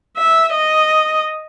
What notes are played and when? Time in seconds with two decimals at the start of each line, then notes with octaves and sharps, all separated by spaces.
0.17 E5
0.53 D#5